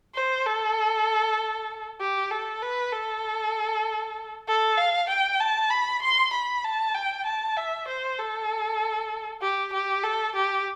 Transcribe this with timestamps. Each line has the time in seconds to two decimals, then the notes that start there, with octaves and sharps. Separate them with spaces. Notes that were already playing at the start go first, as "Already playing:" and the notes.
0.15 C5
0.46 A4
2.01 G4
2.31 A4
2.62 B4
2.93 A4
4.48 A4
4.78 F5
5.09 G5
5.40 A5
5.70 B5
6.02 C6
6.33 B5
6.64 A5
6.94 G5
7.26 A5
7.56 E5
7.88 C5
8.19 A4
9.42 G4
9.73 G4
10.04 A4
10.35 G4